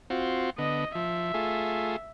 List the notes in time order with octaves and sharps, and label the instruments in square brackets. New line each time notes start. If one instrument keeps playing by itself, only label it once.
[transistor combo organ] C4 F4 F#4
[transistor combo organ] D3 B3 [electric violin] D#5
[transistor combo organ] F3 [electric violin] E5
[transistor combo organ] A3 F4 G#4